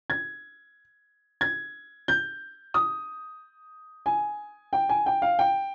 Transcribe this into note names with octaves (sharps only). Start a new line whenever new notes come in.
G#6
G#6
G6
D#6
G#5
G5
G#5
G5
F5
G5